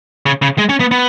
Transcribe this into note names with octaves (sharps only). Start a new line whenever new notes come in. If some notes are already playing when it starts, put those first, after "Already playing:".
C#3
C#3
G#3
C#4
B3
B3